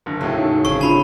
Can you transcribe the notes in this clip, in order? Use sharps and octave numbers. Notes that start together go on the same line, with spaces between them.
F#1 D3
E1 A2 C#3 A3
D#4
G1 C#3 C4 C#6
D4 F4 A5 B5